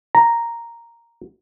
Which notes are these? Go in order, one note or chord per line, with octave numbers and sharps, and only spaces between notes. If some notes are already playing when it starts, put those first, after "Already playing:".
A#5